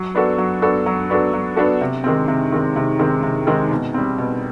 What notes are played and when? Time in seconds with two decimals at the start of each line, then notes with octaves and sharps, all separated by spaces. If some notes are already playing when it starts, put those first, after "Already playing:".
Already playing: F#3
0.14 B3 D4 F#4 A4
0.38 F#3
0.62 B3 D4 F#4 A4
0.86 F#3
1.09 B3 D4 F#4 A4
1.34 F#3
1.56 B3 D4 F#4 A4
1.81 C3
2.04 D#3 G#3 C4
2.28 C3
2.53 D#3 G#3 C4
2.76 C3
2.99 D#3 G#3 C4
3.23 C3
3.47 D#3 G#3 C4
3.71 B2
3.94 G3 C4
4.18 B2